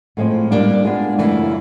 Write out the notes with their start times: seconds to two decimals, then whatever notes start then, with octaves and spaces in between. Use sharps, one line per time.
0.17 A2 F3 G#3 C4
0.51 G3 A#3 D4 G4
0.84 G#3 B3 D4 F4
1.18 F#2 C#3 E3 A3